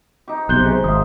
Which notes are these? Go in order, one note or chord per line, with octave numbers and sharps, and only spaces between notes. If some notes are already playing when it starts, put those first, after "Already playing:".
D#4 G4
B1 C3 C5 F#6 G6 G7
G#3 G#4
G#1 E5 F5 D#6